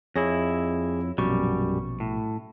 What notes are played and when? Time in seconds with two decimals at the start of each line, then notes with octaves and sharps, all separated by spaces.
0.16 F2 E4 G#4 C#5 A#6
1.18 A#1 F#2 B2 G3 C#6
2.00 A2